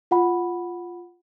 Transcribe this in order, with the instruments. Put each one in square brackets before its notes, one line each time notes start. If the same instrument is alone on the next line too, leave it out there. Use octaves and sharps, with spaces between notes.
[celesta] F4 F#5 B5